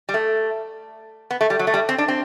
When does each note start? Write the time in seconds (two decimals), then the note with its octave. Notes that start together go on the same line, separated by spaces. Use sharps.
0.09 G3
0.14 A3
1.31 B3
1.41 A3
1.50 G3
1.59 F#3
1.67 A3
1.74 G3
1.89 C4
1.98 D4
2.08 C4